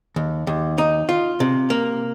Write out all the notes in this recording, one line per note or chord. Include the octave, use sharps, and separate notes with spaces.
D#2
D#2
D#4
F4
C3
A#3